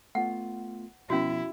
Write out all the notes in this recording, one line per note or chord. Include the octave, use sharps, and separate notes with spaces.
A3 B3 F4 F#5
B2 F3 B3 C#4 E4 F#4